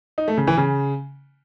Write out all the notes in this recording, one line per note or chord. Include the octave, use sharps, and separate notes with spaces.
D#4
A3
C#3
E3
C#3